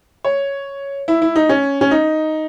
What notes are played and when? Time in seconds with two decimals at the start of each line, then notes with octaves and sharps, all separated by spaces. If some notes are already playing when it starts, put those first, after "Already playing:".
0.25 C#5
1.08 E4
1.22 E4
1.36 D#4
1.49 C#4
1.81 C#4
1.91 D#4